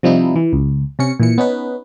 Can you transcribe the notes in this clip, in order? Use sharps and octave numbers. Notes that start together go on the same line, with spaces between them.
C3 F3 G3 D#4 E4
E3
C#2
C3 C#4 C#7
A#2 E3 C#7
B3 C#4 D#4 B4